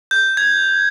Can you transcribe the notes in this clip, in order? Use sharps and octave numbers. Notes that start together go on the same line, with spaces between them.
G6
G#6